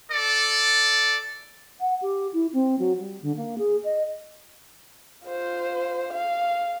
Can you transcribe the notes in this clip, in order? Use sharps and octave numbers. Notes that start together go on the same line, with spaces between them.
A4 D5
F#5
G4
E4
C4
F#3
G3
D3
A#3
G#4
D#5
F4 C5
F5